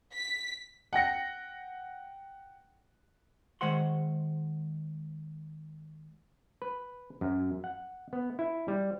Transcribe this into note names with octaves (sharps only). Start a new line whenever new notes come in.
B6
F#5 G5 A#6 C#7
D#3 G#3 C5 F#5 C6
B4
F#2
F#5
B3
E4
G3